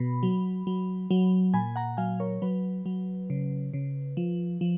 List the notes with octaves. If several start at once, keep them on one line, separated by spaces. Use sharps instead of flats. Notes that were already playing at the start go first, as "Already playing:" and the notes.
Already playing: B2 B5
F#3
F#3
F#3
A#2 G#5 B5
F#5 A#5
F#3 F5 G#5
A#4 C#5
F#3 B4
F#3
C#3
C#3
F3
F3